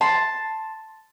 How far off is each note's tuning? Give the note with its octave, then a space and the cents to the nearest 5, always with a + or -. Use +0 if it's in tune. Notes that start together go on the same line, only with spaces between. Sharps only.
A5 +0 C6 +0